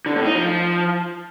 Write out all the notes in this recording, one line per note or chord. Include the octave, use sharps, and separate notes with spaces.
D3
A2
D#4
F3